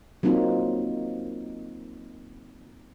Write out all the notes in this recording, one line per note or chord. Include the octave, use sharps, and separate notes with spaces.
F#3 A#3 C4 D#4 F4